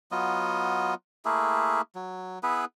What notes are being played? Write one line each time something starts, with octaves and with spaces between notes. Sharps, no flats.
F#3 B3 F4 D#5
A3 A#3 E4 G#4
F#3
B3 E4 G#4 B4